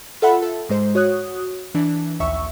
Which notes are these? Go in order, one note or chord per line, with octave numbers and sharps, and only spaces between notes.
F4 A4 E5 F#5 B5
A4
G#2 G#3 C5
F#4 C#5 D#6 F#6
E3 D4
A#1 D#2 E5 C#6 E6